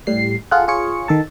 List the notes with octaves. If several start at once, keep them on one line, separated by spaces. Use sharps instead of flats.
A2 G3 C7
F4 G#4 A4 F#5
F4 G#4 C#5 C#7
D#3 A4 A5